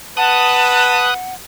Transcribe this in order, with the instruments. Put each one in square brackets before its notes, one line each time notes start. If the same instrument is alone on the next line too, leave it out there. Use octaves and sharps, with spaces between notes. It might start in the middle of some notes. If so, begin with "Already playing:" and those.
[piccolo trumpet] B4 [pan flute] F#5 [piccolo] A5 [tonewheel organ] D#6 F#6